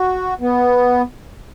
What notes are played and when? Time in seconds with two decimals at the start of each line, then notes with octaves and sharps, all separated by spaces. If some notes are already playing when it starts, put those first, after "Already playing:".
Already playing: F#4
0.40 B3